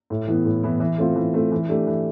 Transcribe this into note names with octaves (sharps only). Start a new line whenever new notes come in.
A2
E3 B3 E4
A2
E3 B3 E4
E3
A3 C4 F4
E3
A3 C4 F4
E3
A3 D4 G4
E3